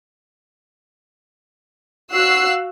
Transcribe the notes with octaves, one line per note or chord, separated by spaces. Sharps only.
F#4 F5 E6 F#6 C7